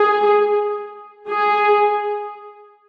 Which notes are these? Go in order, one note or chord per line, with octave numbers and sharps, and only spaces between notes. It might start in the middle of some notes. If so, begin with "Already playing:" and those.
Already playing: G#4
G#4